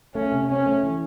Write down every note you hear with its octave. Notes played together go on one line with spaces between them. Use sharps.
A3 C#4
C3
C4 C#4
A3
E3